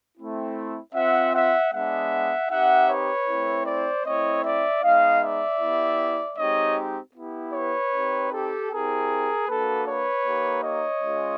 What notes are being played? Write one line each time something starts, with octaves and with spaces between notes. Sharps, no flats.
A3 C4 E4
C4 F4 E5 F#5
E5 F#5
G#3 B3 D4 E5 F#5
C4 D#4 G4 E5 F#5
B4 C#5
A3 C4 E4
C5 D5
A3 C4 E4 C#5 D#5
D5 E5
G#3 B3 D#4 D#5 F5
D5 E5
B3 E4 G4
G#3 C4 D#4 G4 C#5 D#5
B3 E4 G4
B4 C#5
C4 D#4 G4
G4 A4
C4 E4 G4 G#4 A#4
A#3 D4 F#4 A4 B4
B4 C#5
A#3 D#4 G4
C#5 D#5
G#3 C#4 F4